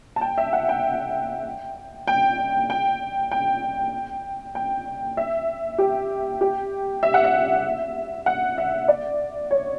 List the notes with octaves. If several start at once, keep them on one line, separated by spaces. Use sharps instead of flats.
A5
G5
E5
F#5
G5
G5
G5
G5
G5
E5
G4
G4
E5
F#5
E5
F#5
E5
D5
C#5